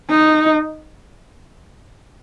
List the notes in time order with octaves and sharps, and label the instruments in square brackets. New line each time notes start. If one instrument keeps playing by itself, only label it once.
[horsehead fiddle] D#4